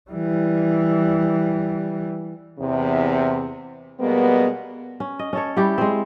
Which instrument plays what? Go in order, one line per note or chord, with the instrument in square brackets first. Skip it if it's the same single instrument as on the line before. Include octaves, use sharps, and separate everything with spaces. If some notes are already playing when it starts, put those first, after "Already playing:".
[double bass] E3 G3
[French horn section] E2 C3
B2 G3 G#3 A#3 B3
[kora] C#4
D#5
C#4 A4 C#5
G3 E4 G4
G#3 C4